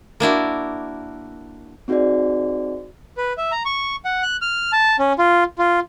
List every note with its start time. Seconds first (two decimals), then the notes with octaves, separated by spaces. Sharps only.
0.20 A#3 D4 E4 F#4
1.88 C4 D#4 F#4 G#4 C5 D5
3.17 B4
3.38 E5
3.52 A#5
3.65 C#6
4.05 F#5
4.23 F#6
4.41 F6
4.72 A5
4.99 C#4
5.19 F4
5.58 F4